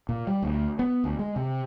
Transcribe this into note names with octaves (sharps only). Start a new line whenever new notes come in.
A#2
G3
D2
B3
D2
G#3
C3